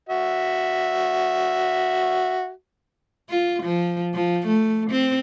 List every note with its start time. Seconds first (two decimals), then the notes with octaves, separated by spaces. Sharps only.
0.09 F#4 E5
3.30 F4
3.63 F3
4.14 F3
4.47 A3
4.91 C4